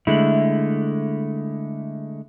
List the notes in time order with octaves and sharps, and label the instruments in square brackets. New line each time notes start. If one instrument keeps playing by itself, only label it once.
[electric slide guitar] D3 G#3 A3 E4